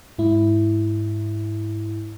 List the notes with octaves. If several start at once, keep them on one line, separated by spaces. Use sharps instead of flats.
G#2 E4